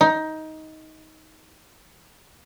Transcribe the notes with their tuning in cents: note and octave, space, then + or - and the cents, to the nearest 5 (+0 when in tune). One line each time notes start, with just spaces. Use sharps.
D#4 +15